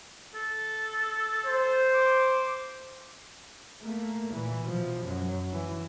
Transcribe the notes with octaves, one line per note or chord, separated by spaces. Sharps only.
A4
C5
D6
A3 A#3
A#2 E3
B2 F3
F#2 F#3
E3